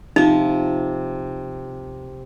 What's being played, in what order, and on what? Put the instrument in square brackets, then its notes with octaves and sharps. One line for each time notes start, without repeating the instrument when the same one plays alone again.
[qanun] C3 F3 [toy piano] D#4